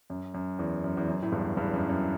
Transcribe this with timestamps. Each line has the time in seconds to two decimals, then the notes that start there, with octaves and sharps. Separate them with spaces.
0.10 F#2
0.34 F#2
0.59 E2
0.84 F#2
0.97 E2
1.08 F#2
1.22 A2
1.32 E2 G2
1.57 E2 G2
1.74 F#2
1.89 F#2